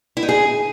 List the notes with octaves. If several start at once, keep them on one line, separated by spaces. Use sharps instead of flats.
E4
D#4
G#4